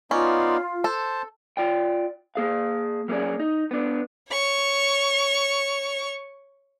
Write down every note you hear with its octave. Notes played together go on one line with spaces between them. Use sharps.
B3 C#4 D#4 F4 D5
A4 C5 A5
F4 D5 G5
A#3 G#4 F5
F#3 A#3 C#4 G#4 D5
D#4
B3 D4
C#5 C#6